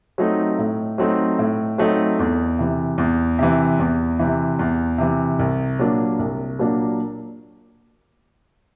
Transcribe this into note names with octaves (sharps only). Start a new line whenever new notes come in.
F#3 A3 C4 D#4
A2
F#3 A3 C4 D#4
A2
F#3 A3 C4 D#4
E2
C3 E3
E2
C3 E3
E2
C3 E3
E2
C3 E3
C2
A#2 F#3 A#3 D4
C2
A#2 F#3 A#3 D4